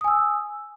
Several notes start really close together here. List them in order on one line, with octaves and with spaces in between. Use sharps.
D#6 G#5 E6